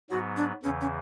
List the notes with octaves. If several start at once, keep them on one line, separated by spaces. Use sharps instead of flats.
G#2 F#3 B3 F#4
D4
E2 C#3 E3 C#4
C#4